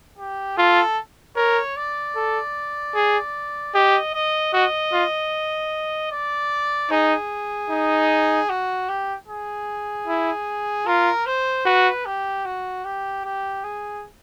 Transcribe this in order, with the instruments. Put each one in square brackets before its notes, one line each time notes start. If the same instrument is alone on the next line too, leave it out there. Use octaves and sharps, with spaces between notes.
[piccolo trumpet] G4
[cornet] F4 [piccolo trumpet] A4
[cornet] A#4 [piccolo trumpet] C#5
[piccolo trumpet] D5
[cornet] A4
G#4
[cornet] G4 [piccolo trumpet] D#5
[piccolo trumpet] D#5
[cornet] F#4 [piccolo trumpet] D#5
[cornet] F4
[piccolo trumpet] D5
[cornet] D#4 [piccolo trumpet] G#4
[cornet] D#4
[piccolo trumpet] F#4
G4
G#4
[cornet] E4
[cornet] F4 [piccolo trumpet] A#4
[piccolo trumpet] C5
[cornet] F#4 [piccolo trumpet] B4
[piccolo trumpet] G4
F#4
G4
G4
G#4